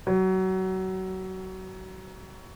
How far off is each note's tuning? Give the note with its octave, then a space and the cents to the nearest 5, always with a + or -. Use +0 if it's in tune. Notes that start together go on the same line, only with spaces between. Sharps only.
F#3 +25